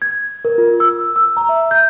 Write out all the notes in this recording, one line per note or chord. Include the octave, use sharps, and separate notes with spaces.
G#6
A#4
F4
E6
E6
A#5
E5
G6